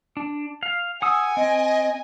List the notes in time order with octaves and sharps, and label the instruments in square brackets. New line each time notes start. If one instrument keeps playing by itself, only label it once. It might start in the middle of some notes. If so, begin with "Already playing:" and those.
[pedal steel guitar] D4
F5
[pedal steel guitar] F#5 D#6 E6 [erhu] G#5
[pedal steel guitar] C4 [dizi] D#5